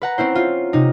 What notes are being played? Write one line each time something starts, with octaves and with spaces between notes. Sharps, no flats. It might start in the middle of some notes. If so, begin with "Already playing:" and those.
B4 F#5 A#5
C4 C#4 E4 C5
F4
C3 D#4